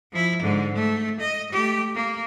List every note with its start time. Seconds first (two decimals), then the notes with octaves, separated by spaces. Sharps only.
0.12 F3 E4
0.42 G#2 D3
0.75 A3
1.20 D#5
1.52 A3 G4
1.95 A#3